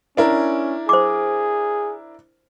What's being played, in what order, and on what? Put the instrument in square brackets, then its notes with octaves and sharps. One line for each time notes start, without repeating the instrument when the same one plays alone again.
[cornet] C#4 [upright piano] D4 E4 A#4
[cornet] G#4 [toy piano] C5 D6